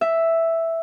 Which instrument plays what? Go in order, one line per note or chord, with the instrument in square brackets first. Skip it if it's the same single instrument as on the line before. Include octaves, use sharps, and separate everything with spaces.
[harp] E5